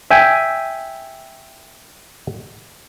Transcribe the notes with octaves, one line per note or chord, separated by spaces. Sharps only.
E5 G5 G#5